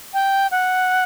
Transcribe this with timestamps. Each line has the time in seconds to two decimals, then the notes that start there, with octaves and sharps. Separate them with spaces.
0.14 G5
0.51 F#5